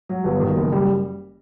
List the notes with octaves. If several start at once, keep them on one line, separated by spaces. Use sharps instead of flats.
F#3
G1
D#3
F#1
G3